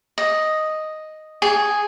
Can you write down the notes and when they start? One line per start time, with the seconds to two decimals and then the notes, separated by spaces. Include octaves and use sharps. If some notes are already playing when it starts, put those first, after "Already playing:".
0.18 D#5
1.42 G#4